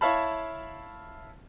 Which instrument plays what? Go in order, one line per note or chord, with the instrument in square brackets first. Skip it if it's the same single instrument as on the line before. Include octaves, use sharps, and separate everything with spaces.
[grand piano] E4 C#5 E5 F5 A5 B5